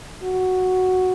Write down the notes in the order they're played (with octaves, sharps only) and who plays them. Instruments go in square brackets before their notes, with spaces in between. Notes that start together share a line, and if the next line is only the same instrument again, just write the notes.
[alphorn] F#4